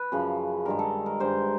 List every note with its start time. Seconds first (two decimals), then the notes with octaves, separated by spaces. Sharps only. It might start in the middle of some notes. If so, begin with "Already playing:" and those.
Already playing: B4
0.12 F#2 C#3 F3
0.65 G2 D#3 G#3 A#4
0.79 A4
1.06 A#4
1.20 G2 D#3 G#3 C5